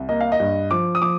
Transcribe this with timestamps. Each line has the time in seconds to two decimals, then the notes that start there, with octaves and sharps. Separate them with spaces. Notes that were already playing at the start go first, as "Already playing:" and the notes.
Already playing: C2
0.09 A#3 D#5
0.21 F5
0.32 D#5
0.40 G2
0.71 F3 D6
0.95 D#6
1.02 F3 D6